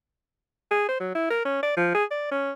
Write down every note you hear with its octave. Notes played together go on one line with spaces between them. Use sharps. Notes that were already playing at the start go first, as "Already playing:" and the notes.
G#4
C5
F#3
E4
A#4
C#4
D5
F3
G#4
D5
C#4